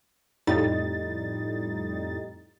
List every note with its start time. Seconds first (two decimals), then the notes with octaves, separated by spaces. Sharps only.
0.47 F2 A2 G3 D#4 A6